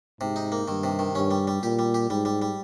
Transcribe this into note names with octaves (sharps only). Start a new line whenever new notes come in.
G#2 C3
D#4
A#3
G2 D#3
C3
D#3
G2 C#4
G3
G3
A#2 G4
G3
G4
G#2 G3
G3
G3